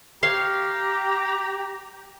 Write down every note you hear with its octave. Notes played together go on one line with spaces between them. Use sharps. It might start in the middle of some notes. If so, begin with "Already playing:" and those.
G4 C#5 F5 A#5 C6